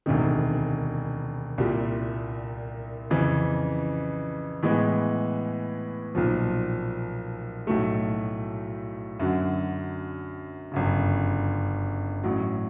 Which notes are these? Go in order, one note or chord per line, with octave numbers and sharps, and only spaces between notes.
E1 D2 C3 D#3
C2 A#2 G3
F2 C#3 E3
A2 E3 G#3 B3
B1 A#2 F3
B1 A2 F#3 A3
F#2 D3 F#3
G1 F#2 C#3
A1 A2 F#3